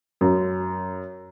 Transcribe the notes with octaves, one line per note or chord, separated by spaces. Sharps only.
F#2